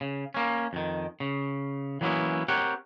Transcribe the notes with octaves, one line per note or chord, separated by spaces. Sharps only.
C#3
A#3 C#4
F2 D#3
C#3
E3 F#3 A#3 B3 C#4 E4
C4 G4 A#4 C#5 F#5